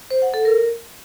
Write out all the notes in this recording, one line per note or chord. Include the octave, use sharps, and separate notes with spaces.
C5
F#5
A4
A#4